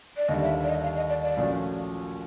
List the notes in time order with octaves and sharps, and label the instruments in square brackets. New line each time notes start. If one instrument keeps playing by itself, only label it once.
[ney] D5
[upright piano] D#2 D3 G3 [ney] D#5
[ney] E5
D5
D#5
F5
D#5
D5
D5
[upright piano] A#1 A#2 F#3 A3 C#4